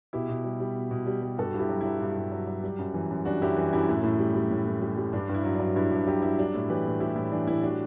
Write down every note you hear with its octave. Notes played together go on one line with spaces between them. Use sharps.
B2 E4 G4
B2
G3
G3
B2
B2
G3
G3
G2 F#4 A4
G2
E4 G4
F#3
F#3 E4
G2
G2
F#3
F#3
G3
F#2
E3
F#2
G3 D4 F#4
F#2 E4 G4
E3
F#2 E4 G4
A2 E4
A2
G3
G3
A2
A2
G3
G3
G2 D4
G2
E4
F#3
D4
F#3
G2 E4
G2
F#3 E4 G4
F#3 E4
G3 D4
A2 E4
E3 G4 B4
A2
G3 E4 G4
A2 E4
E3 D4
A2 E4
G3 D4 F#4